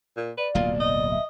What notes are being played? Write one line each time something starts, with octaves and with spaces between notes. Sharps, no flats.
A#2
B4 D5
D1 B1 A#3 F4
D#5
E5